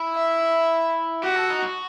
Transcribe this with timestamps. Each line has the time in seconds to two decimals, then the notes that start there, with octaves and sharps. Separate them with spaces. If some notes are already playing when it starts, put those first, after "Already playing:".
Already playing: E4
0.16 E5
1.23 F#4 G4
1.36 A4
1.50 D#4
1.63 F#4